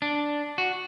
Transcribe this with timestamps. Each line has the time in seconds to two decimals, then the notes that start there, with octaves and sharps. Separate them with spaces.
0.02 D4
0.58 F#4